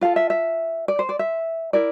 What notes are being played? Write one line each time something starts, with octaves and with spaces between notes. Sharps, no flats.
F4 A4 F5
E5
E5
D5
C5
D5
E5
E4 A#4 D5